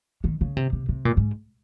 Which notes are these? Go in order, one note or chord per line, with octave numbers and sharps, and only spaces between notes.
D#3
C#3
C3
C3
C3
A#2
G#2